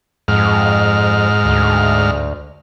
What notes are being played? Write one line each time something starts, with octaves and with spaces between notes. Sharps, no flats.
F2 G#2 F6
D2